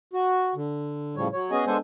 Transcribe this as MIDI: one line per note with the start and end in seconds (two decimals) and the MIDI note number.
0.13 0.54 66
0.55 1.16 50
1.16 1.28 45
1.16 1.28 49
1.16 1.28 53
1.16 1.28 55
1.16 1.28 73
1.32 1.51 54
1.32 1.51 73
1.51 1.65 59
1.51 1.65 61
1.51 1.65 66
1.51 1.65 68
1.51 1.65 75
1.51 1.65 80
1.67 1.77 56
1.67 1.77 59
1.67 1.77 62
1.67 1.77 69
1.67 1.77 72
1.67 1.77 80